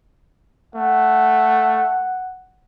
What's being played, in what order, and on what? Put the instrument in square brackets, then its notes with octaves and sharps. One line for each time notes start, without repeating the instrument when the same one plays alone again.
[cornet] A3 [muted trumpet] F#5